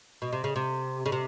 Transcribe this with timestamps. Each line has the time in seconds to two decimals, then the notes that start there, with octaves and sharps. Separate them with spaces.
0.22 B2
0.33 C3
0.44 C#3
0.56 C3
1.06 C#3
1.12 C3